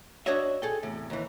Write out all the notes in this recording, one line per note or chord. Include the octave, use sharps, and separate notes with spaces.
D4 F#4 C#5 D#5 E5
G#4 A4 G5
E2 A2 C3
D#2 E3